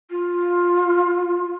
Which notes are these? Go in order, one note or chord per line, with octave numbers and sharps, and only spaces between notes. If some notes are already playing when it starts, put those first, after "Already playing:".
F4